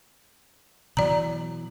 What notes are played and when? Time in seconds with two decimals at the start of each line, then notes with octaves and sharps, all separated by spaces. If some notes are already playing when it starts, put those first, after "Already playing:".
0.97 B2 E3 F#3 D5 A#5